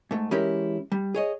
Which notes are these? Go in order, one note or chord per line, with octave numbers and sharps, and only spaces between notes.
G#2 A3
E3 G#3 C#4 E4 G4 A#4
G3
G#4 C#5 D#5